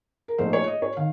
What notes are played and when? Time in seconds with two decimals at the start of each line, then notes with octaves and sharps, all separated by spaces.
0.28 A#4
0.38 A#1 A#2 A3 D#4 C5
0.53 C#5
0.68 D#5
0.82 C#5
0.97 D#3 F5